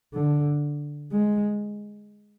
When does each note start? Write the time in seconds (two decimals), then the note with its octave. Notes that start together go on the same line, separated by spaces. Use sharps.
0.14 D3
1.12 G#3